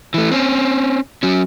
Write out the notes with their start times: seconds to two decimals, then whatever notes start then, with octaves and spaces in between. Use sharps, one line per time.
0.14 E3 A3
0.32 C4 C#4
1.23 F#3 C#4